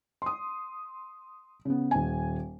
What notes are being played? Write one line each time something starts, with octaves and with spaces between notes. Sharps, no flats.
C6 D#6
C#3 B3
D#1 G#5